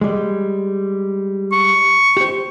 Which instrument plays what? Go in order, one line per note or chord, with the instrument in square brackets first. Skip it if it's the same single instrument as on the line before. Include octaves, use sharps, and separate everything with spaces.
[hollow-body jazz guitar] G3 G#3
[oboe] C#6
[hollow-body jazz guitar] G4 C5